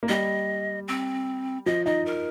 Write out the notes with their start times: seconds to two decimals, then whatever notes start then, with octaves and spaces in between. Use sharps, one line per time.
0.03 A#3
0.09 G3 D#5
0.88 C4
1.66 F3 D#5
1.86 D#4 D#5
2.06 A#4